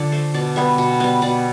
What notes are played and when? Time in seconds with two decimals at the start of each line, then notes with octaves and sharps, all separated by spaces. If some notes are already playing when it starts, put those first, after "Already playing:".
Already playing: D3 F3 D4 D5
0.12 A3 C5
0.34 B2 D5
0.56 G3 B3 E5
0.78 B2
1.00 G3 B3
1.22 B2 D5